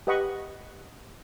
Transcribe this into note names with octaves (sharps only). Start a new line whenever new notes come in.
G4 B4 D#5 F#5 B5 C#6